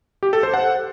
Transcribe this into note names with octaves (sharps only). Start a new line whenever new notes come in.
G4
A4
C5
F#5